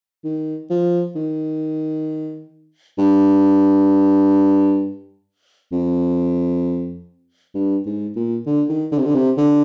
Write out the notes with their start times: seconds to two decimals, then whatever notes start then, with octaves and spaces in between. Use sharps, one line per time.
0.24 D#3
0.70 F3
1.15 D#3
2.98 G2
5.72 F2
7.55 G2
7.86 G#2
8.16 A#2
8.46 D3
8.70 D#3
8.92 D3
8.99 C3
9.06 D3
9.15 C3
9.38 D3